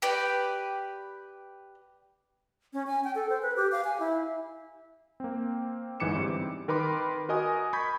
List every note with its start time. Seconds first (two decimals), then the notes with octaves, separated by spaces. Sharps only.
0.02 G4 B4 D5
2.73 C#4
2.87 G#5
3.04 G5
3.15 A4
3.29 C5
3.42 B4
3.56 G4
3.72 F5
3.84 G#5
4.00 E4
5.20 A#3 C4
6.00 G1 G#2 E3 D6 C#7 E7
6.16 G3 C4
6.68 D#3 A#4 B4 B5 C6 D6
7.29 F#4 A#4 D#5 G#5 D#6
7.73 B5 C#6 G6 G#6 B6